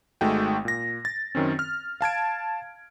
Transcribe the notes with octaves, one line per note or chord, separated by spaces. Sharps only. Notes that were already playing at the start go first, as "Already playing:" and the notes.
G#1 G#3 A3 D#4 F#4 G5
A#2 A#6
A6
F#2 D#3 C4 C#4
F6
F5 A5 G#6 D7